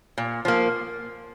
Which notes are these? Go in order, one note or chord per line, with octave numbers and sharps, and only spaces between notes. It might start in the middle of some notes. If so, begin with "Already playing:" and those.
A#2
F3 A#3